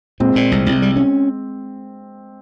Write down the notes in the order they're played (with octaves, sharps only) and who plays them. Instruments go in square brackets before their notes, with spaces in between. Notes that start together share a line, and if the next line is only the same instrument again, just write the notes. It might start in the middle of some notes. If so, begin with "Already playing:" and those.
[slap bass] A#2 [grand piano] G#3 C4
[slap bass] A#2
C2
C2
G3
C#4